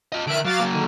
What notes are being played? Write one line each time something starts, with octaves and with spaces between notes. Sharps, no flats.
F4 D#5
D3 A#4 E5 F#6 D7
F#3 F#4 F5 D6 A6
F#3 A#3
D3 D#3